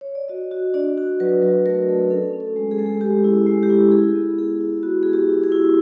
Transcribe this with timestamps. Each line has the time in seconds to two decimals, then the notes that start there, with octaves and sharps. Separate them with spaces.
0.01 C#5
0.15 D5
0.28 F#4 D#5
0.51 F#4
0.74 D4 D5
0.98 F#4
1.20 F#3 B4
1.42 F#3
1.66 A3 A#4
1.88 A3
2.10 C#4 A4
2.33 C#4
2.40 A4
2.56 G#3
2.71 G#4
2.78 G#3 A4
2.86 G#4
3.01 G#3 G4
3.24 E4
3.46 G#3
3.63 G4
3.70 E4
3.92 E4 G#4
4.15 B3
4.38 E4 G#4
4.61 E4
4.83 B3 F#4
5.03 E4 G#4
5.13 G4
5.29 E4
5.44 G#4
5.52 E4